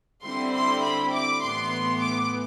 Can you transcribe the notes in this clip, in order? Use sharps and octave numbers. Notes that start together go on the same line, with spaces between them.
D3 G3 C4 E4 C6
C6
B5
D6
A2 E3 B3 C6
D6